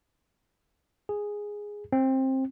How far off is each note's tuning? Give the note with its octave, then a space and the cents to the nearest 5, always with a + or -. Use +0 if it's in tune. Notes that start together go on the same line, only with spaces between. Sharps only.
G#4 -5
C4 +20